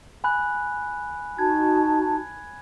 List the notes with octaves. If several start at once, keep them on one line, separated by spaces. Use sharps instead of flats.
G#5 B5 F#6
D#4 F#4 A5 G#6